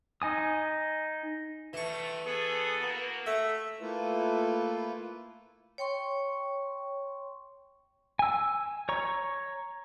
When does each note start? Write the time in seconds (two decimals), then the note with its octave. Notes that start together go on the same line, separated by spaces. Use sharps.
0.22 D#4 G#5 D#6
1.73 G2 E3 A3 C#6
2.27 B3 G#4 A4
2.79 A#3 F#4
3.26 A3 E5
3.81 A3 A#3 E4 F4 A4 B4
5.78 C#5 G5 C6 C#6
8.19 G#5 E6
8.89 C#5 A#5 C#6